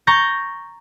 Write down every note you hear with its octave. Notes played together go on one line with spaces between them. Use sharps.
A#5 C#6 G6 A6 A#6